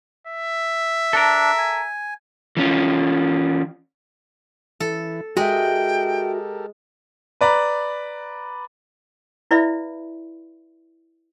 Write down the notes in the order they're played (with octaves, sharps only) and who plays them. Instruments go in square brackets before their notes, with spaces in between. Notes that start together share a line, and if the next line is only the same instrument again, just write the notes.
[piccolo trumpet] E5
[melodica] D4 [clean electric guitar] A4 A#4
[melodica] G#5
[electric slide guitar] E3 C#4 F4
[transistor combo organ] E3 E4 [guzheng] A4
[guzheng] G#3 [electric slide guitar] F#4 E5 [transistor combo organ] G4 A4 A#4 [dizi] G5
[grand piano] B4 D5 A#5 B5
[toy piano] E4 B4 D5 E5 F5 B5